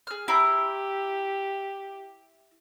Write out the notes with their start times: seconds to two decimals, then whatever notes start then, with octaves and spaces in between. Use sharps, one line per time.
0.07 G#4 F6
0.28 E4 G4 C5 A#5